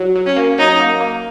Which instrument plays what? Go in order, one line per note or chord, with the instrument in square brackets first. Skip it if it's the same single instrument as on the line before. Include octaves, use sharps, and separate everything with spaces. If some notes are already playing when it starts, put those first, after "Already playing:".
Already playing: [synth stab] F#3
F#3
[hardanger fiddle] C#4
[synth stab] A#3
[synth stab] F#3 [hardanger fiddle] D#4
[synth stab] A#3
A#3